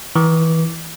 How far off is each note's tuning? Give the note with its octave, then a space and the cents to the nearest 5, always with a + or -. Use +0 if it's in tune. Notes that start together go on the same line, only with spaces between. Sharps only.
E3 -25 D6 -20